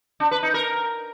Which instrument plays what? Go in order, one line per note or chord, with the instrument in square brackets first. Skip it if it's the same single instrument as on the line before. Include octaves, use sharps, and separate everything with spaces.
[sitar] D4
B4
D#4
A#4